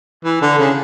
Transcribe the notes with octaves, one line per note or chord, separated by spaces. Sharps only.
E3
D3
C#3